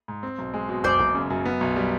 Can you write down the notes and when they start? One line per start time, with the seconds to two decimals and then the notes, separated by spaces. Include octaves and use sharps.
0.08 G#2
0.23 C4
0.38 B1
0.54 G#3
0.69 B2
0.84 F#1 C5 D5
1.00 F#1
1.15 C#3
1.30 F#2
1.46 B3
1.61 B1
1.76 G3